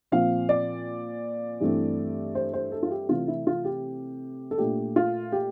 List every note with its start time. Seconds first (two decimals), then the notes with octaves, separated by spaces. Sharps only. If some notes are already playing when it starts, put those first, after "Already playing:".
0.12 A#2 F3 C4 F5
0.49 D5
1.61 G2 E3 A3 C4
2.35 C5
2.54 C5
2.72 A4
2.83 F4
2.91 G4
3.09 C3 E3 A3 C4 F4
3.28 E4
3.47 F4
3.65 G4
4.51 A4
4.58 A#2 A3 D4 G4
4.96 F4
5.32 G4